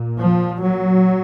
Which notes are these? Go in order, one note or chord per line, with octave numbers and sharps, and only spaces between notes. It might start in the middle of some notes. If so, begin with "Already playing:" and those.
Already playing: A#2
F3
F#3